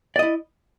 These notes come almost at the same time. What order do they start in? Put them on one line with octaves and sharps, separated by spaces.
D5 D#5 E4